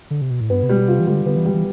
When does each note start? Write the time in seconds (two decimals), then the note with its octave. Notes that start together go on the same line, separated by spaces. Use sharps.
0.11 D3
0.21 C3
0.31 B2
0.40 A2
0.50 G2 B3
0.63 C3
0.69 B2 G3
0.88 C3 F4
1.00 E3
1.07 D3 G3
1.26 D3 B3
1.36 E3
1.45 G3
1.54 E3